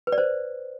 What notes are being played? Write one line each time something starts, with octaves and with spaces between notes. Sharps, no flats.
B4
D5
C5